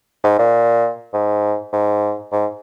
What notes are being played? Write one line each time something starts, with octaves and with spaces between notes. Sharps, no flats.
G#2
A#2
G#2
G#2
G#2